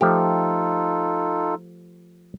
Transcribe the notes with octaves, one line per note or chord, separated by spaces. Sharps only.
F3 A3 D#4 F4 G4 A4